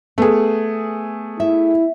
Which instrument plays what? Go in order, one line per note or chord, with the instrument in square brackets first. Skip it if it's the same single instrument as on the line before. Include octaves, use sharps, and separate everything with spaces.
[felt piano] A3 G#4 [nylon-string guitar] B3
[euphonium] E4 [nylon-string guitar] E5